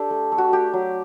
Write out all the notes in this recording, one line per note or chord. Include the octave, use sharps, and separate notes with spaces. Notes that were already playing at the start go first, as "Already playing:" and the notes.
Already playing: D4 G4 A4
A3
A3
F#4
A3 G4
F#3